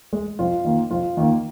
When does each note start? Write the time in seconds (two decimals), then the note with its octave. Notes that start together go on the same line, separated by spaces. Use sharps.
0.13 G#3
0.39 F2 F4
0.65 D#3 A#3
0.91 F2 F4
1.17 D#3 A#3